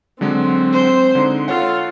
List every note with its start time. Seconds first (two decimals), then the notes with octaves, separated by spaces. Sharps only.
0.21 D3 F#3 G#3 C4
0.73 C5
1.15 D3 G#3 D#4
1.48 F4 A4 C#5 F#5